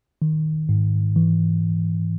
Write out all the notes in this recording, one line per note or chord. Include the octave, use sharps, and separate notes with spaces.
D#3
G#2
E3